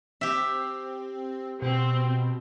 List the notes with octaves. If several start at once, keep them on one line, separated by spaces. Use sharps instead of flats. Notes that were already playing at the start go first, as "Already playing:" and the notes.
C4 G4 E5
B2 C4